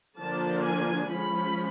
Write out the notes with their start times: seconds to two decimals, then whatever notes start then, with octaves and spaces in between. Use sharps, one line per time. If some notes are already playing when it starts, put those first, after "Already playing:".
0.20 D3 F3 A#3 D4 A5
0.64 G#5
1.09 F3 G#3 C#4 B5